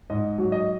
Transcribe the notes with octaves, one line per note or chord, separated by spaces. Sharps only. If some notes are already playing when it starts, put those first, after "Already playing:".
G#2 D#5
F#3
D#5